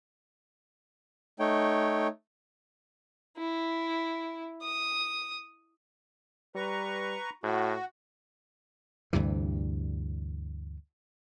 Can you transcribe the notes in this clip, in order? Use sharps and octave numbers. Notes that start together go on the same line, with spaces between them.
A3 D#4 C#5 G5
E4
D#6
G3 B4 A#5 C#6
A2 F#4
D2 G2 C3 E3